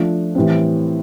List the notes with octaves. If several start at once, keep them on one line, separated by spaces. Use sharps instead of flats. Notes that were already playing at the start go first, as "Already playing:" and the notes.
Already playing: F3 A3 D4
A2 E3 G3 C4